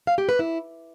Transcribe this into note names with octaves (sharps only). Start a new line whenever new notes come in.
F5
G4
B4
E4